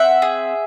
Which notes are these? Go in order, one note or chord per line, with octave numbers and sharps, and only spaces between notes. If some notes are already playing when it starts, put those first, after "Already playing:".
Already playing: C4 E5 F#5
G#4